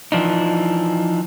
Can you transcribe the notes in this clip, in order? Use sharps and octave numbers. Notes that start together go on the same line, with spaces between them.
E3 F3 D4 D#4